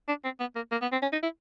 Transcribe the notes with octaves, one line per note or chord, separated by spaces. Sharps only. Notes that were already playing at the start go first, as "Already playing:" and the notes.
D4
C4
B3
A#3
A#3
B3
C4
C#4
D#4
E4